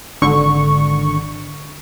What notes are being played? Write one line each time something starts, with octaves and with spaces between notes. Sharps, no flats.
G#1 D3 C#6